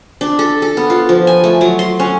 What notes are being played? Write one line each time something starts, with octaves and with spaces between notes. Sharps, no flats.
D4
A4
A4
B3
F4
F3
G#5
A3
F#3
C6
C#4